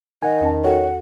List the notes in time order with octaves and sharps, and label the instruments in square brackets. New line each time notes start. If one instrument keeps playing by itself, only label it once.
[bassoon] D#3 [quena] D#5 [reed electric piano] F#5 G#5
[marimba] E2 C#4 A5
[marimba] F#4 A4 G5 [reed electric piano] C#5 [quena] F#5